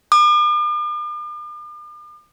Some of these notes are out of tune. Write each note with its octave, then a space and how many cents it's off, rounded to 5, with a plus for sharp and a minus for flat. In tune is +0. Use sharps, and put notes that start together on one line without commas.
D6 +45